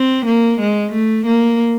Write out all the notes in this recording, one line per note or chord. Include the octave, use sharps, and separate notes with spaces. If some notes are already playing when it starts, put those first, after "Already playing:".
Already playing: C4
A#3
G#3
A3
A#3